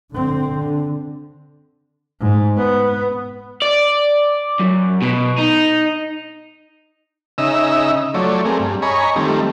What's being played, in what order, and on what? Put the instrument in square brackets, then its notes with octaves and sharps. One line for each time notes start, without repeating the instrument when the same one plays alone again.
[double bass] D3 C4
D3
G#2
B3
[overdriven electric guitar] D5
F#2
B2
D#4
[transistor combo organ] C#3 D#4 D#5 E5 E6
F3 F#3 A3 C#5 D5
A3 C4 G#4 A#4
G2
C#5 D#5 G#5 A#5 B5 C#6
D#3 F3 G3 A3 C4